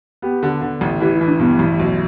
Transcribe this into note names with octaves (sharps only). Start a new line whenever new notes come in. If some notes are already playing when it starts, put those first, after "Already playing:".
B3 G4
D3
D3
A1
E3 G4
E4
E3
D4
G2 B3
A1
B1